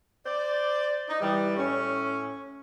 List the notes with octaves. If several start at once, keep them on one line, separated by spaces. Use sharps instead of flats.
C5 D5
D#4
E3 G3
A2 C#4